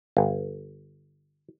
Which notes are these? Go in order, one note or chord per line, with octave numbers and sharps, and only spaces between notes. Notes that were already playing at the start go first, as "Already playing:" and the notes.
G1